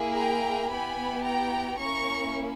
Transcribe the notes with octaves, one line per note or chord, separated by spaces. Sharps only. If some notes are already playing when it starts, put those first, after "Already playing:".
Already playing: A#3 E4 G#4
G5 A#5
B3 E4 G4 G#5 B5
G5 A#5
A#3 C#4 E4 A#5 C#6